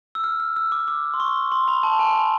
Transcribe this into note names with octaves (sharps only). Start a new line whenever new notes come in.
E6
F6
F6
E6
D6
D6
C6
C#6
C6
B5
A5
G#5
B5